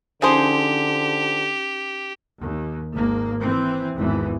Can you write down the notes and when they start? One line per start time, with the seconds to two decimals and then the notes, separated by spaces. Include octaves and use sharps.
0.22 D3 F3 C#4 D#4 G4 G#4 C5 D#6
2.41 D#2
2.93 G#1 A#3
3.40 E3 C4
3.96 G#1 E2 G#2 E3